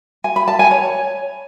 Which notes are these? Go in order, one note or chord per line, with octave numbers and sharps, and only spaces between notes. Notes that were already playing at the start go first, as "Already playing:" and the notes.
G#5
B5
A5
G#5
C#5